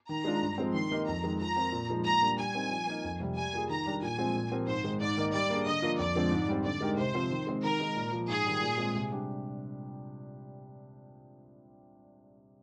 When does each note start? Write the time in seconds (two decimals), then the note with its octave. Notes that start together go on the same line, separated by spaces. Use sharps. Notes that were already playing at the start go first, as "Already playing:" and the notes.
0.09 D#3 A#5
0.24 G#3 D4 F4
0.42 G2
0.58 F3 G#3 C4
0.74 D#3 C6
0.91 A#3 D#4 G4 A#4
1.07 F2 A#5
1.24 D#3 G#3
1.39 F3 A#5
1.57 C4 F4 A#4
1.72 A#2
1.90 F3 G#3 D#4
2.05 A#2 A#5
2.22 G3 A#3 D4
2.38 G3 G#5
2.54 C4 D#4 A#4
2.71 F3
2.87 A#3 D#4 A#4
3.04 F2
3.20 C3 G3
3.37 G3 G#5
3.53 A#3 F4 G#4
3.69 D#3 A#5
3.86 G3 D4 G4 A#4
4.02 A#2 G#5
4.18 F3 G#3 C4
4.35 A#2
4.51 F3 C4 G4 A#4
4.67 G#2 C5
4.84 D#3 G#3
5.00 G#2 D5
5.16 D#3 A#3 D#4 A#4
5.34 G3 D5
5.50 A#3 D4 G#4
5.66 D3 D#5
5.82 F3 A#3 D4 F4
5.99 F2 D5
6.15 D3 F3 G#3 C4
6.31 G#2
6.48 G3 C4
6.64 D3 D5
6.81 G#3 D#4 G4 A#4
6.97 C3 C5
7.14 F3 C4 F4
7.30 D#3
7.47 G#3 C4
7.63 D#3 A#4
7.80 G#3 D#4
7.96 A#2
8.12 F3 A#3 F4
8.28 G#2 G#4
8.45 D#3 G3
8.62 A#2
8.78 G#3 C4 F4
8.95 C3
9.11 G3 D4 G4